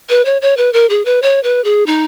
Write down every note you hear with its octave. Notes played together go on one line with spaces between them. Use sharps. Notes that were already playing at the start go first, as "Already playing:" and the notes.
B4
C#5
C#5
B4
A#4
G#4
B4
C#5
B4
G#4
D#4